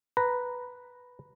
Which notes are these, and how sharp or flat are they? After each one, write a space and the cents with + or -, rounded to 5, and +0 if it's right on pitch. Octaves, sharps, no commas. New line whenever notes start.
B4 +0 A#5 +0